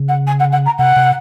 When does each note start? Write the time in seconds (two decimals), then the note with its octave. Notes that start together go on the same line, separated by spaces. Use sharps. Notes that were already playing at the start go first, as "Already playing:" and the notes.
Already playing: C#3
0.09 F#5
0.27 G#5
0.40 F#5
0.53 F#5
0.66 A#5
0.79 C3 F#5
0.96 C3